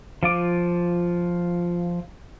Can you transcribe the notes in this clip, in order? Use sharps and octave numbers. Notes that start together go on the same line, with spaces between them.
F3 F4 D6